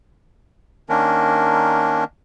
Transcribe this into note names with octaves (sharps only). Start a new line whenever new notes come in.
D#3 A#3 C#4 D4 A#4